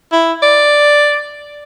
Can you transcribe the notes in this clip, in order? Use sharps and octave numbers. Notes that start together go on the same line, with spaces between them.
E4
D5